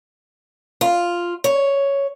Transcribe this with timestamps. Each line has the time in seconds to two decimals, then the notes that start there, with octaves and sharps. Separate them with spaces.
0.81 F4
1.44 C#5